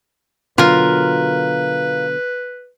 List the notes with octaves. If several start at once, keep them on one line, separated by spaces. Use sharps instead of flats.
B2 D3 F#3 F4 A#4 B4